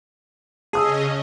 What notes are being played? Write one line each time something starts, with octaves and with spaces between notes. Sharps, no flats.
C#3 C#4 G#4 D#5 A5 D#6 E6